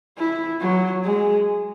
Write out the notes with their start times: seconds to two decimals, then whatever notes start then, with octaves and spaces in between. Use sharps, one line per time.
0.18 E4
0.60 F#3
1.04 G#3